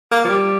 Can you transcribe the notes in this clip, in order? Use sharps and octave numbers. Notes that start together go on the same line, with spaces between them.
A#3
F3
G3